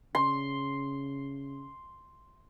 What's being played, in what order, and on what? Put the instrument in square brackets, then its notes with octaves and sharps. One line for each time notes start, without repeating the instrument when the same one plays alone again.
[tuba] C#3 [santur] C6